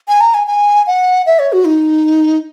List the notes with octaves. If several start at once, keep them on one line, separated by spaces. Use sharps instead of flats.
G#5
A#5
G#5
G#5
F#5
E5
C#5
F#4
D#4